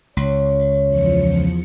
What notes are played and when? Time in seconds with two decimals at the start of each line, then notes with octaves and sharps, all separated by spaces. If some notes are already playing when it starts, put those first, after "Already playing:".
0.17 C#2 C#5
0.87 E2 F3 C#7